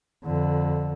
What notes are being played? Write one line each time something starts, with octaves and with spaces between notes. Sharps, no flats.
F2 D3